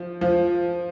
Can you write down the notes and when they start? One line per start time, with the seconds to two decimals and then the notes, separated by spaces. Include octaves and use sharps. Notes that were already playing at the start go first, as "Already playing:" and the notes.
Already playing: F3
0.21 F3